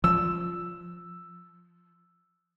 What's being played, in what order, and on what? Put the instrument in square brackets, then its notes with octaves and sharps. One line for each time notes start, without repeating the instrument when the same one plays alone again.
[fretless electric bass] F3 [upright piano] E6